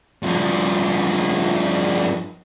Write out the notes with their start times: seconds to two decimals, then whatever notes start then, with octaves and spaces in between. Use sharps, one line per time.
0.23 G2 F3